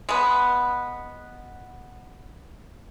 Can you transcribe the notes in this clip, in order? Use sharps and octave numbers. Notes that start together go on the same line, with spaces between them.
G#3 B3